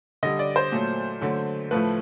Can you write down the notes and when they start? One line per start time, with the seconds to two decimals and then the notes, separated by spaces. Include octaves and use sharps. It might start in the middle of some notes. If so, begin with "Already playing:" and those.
0.23 D3 G3 D#5
0.39 D5
0.56 C5
0.72 A#2 F#3 A3
1.21 D3 F#3 A3
1.71 A2 F3 A3 B4